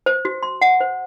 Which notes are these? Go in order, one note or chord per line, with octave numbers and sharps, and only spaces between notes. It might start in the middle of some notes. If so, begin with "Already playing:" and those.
C5
F#4
C6
F#5
C5